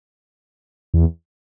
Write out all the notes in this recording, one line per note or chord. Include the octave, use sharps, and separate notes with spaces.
E2